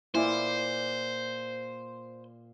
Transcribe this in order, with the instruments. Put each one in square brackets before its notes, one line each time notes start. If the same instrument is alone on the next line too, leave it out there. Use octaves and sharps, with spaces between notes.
[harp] A#2 D5 [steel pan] E4 [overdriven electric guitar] C5